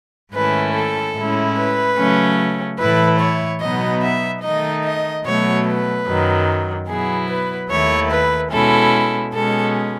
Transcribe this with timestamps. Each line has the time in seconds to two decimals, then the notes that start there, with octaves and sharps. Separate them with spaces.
0.33 G#2 D#3 A3 C#4 E4 B4
0.74 A4
1.15 A2 G#3 C#4 E4
1.57 B4
1.97 C#3 F#3 A3 C#4
2.79 A2 E3 A3 E4 B4
3.20 C#5
3.61 B2 F#3 B3 D#4 D#5
4.02 E5
4.42 D#3 A3 D#4 D#5
4.84 D#5
5.25 B2 F#3 A3 C#5
5.66 B4
6.06 F#2 D#3 F#3
6.88 B2 F#3 B3 E4 G#4
7.29 B4
7.70 D#2 D#3 A3 E4 C#5
8.11 B4
8.51 B2 G#3 C#4 E4 A4
9.34 B2 G#3 C#4 A4